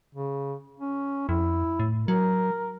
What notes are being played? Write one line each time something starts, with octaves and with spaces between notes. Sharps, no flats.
C#3
C#4
F2 E4
A2
F#3 A#4